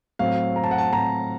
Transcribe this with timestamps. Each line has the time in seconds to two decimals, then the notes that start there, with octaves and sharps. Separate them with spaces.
0.19 A2 F#3 C4 F5
0.56 A#5
0.64 A5
0.71 F#5
0.78 A5
0.93 A2 F#3 C4 A#5